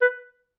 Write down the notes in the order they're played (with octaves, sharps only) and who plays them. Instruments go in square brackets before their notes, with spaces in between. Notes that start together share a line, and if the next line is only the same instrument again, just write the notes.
[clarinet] B4